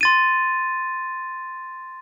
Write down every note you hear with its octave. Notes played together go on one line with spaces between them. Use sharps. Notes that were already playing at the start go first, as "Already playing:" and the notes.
C6 A6 D#7